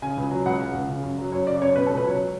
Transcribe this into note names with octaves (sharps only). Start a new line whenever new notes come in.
C#3 G#5
C#2
F#3
C#2 F#5
C#3
C#2
C#3
F#2
F#3
F#2 C#5
C#3 D5
F#2 C#5
B2 B4
A4
C#2
B4
F#3 C#5